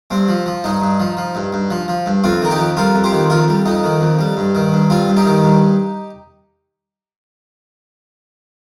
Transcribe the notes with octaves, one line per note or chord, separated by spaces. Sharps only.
G2 C4
F3
F3
G2 D#4
G2
F3
F3
G2
G2
F3
F3
G2
F2 C4 F4
D#3 A#4
D#4 G4
F2
G3 F4 A#4
F2
G4 C5
D#3
F2 F4 A#4
G3
F2 D#4
D#3
F2
G3
G2
D#3
G2
G3 C4 F4
G2
D#4 G4
D#3
G2